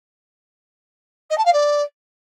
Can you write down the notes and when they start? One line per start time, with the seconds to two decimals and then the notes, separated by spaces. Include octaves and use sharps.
1.30 D#5
1.38 A5
1.45 F5
1.53 D5